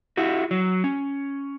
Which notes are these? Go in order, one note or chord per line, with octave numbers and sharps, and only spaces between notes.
E4 F#4 G4
F#3
C#4